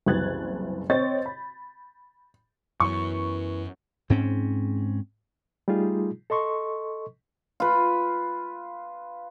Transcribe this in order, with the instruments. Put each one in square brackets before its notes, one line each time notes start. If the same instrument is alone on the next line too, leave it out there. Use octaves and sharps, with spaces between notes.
[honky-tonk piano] F#1 C2 E3 F#6 G#6 A6
C4 C#5 D#5 C#6 G6 A6
B5
[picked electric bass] F#2 F#3 [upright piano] E3 B3 E4 [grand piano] C#6
[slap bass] G#2 C4 C#4
[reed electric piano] G3 A3 D#4 F4 G#4
A4 D#5 C6 C#6
[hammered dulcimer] F4 B4